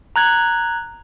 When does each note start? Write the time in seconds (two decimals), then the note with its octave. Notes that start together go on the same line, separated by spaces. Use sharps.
0.16 A#5 F#6 G#6